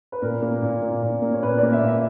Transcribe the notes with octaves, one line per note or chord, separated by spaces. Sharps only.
B4
A#2 A#4
A#3
A#2
A#3
A#2
A#3
C#5
A#2 B4
D5
A#3
E5
A#2
E5